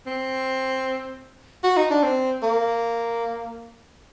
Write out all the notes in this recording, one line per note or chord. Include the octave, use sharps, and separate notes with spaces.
C4
F#4
D#4
D4
C4
A#3